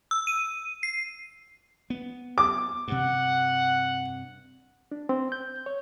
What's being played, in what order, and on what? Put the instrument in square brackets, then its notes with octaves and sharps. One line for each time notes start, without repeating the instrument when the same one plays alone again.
[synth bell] E6
D#7
C7
[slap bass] B3
[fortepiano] D6
[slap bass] G2 C3 [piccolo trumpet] F#5
[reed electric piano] D4
C4
G6
C#5